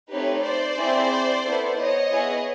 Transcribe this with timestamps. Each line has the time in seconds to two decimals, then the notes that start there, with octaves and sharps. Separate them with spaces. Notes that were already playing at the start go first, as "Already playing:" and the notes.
0.10 A3 C4 D#4 G4 B4 C#5
0.43 C5 D5
0.77 C4 E4 G#4
1.44 B3 E4 A4
1.77 C#5 D#5
2.11 B3 E4 G#4